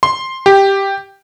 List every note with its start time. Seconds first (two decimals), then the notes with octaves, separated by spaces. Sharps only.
0.03 C6
0.46 G4